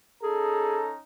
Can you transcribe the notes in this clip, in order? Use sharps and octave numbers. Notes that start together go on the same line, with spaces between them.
C#4 D#4 G#4 A4 A#5